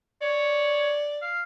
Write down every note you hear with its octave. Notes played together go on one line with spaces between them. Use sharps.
C#5 D5
F5